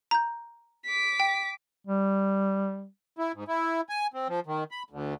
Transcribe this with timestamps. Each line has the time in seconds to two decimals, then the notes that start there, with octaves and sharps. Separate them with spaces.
0.11 A#5 G6
0.86 D6 B6
1.20 G5
1.87 G3
3.18 E4
3.34 G#2
3.48 E4
3.89 G#5
4.14 C4
4.29 F3
4.47 D#3
4.71 B5
4.90 D2